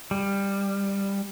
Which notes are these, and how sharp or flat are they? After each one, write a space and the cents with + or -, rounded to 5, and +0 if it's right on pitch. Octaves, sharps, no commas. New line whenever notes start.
G3 +15